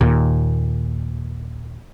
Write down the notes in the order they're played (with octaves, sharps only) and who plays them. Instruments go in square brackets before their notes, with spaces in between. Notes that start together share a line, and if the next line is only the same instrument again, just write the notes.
[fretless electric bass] D#2 A#2